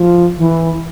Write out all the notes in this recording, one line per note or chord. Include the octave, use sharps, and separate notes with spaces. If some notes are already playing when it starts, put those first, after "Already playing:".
Already playing: F3
E3